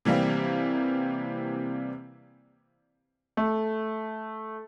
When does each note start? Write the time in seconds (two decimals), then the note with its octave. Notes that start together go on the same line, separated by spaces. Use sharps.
0.05 C3 E3 G3 A#3 C4
3.37 A3